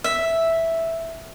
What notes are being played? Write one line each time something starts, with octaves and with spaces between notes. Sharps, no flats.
E5